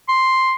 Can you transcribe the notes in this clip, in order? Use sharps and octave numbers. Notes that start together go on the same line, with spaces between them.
C6